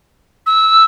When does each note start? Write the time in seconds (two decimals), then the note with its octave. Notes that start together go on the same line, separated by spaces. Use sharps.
0.46 E6